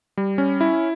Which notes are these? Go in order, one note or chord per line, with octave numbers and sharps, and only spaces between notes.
G3
C#4
E4